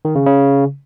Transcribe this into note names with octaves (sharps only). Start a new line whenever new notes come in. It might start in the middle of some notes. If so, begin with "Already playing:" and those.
D#3
C#3
C#3